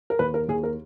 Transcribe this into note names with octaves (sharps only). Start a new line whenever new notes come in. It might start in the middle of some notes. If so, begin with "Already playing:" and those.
A#4
D#2 B4
A#4
D#2 G#4
A#4